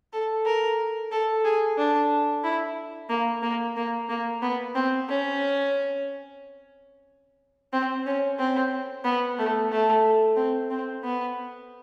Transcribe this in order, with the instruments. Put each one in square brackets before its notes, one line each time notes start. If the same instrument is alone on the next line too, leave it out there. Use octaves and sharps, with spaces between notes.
[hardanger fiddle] A4
A#4
A4
G#4
D4
E4
A#3
A#3
A#3
A#3
B3
C4
C#4
C4
C#4
C4
B3
A3
A3
C4
C4
B3